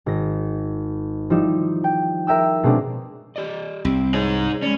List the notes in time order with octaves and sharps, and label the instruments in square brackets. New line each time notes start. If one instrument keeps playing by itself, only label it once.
[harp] G#1 A#6
F3 G3 D#4 E4 E7
G5
A#4 E5 G5 E6
B2 G#3 A#3 C4 D4
[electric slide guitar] G4 D5 D#5
[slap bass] C2 [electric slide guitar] C4
[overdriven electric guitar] D#4 G#4 [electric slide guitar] C#5
[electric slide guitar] G#3 D5 [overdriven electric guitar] C#4